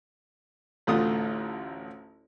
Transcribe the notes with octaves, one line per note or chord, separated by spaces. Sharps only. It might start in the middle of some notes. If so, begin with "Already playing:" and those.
A1 D2 A3 F4 D#6